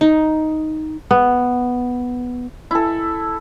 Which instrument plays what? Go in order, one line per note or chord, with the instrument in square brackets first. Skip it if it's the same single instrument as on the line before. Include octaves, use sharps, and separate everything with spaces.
[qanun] D#4
[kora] B3
[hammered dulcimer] E4 A4